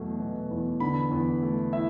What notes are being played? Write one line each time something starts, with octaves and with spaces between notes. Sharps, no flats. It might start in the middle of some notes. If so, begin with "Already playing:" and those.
Already playing: E2 B2 F#3 A3
B2
E2
D3 B5
E2
A3
E4 E5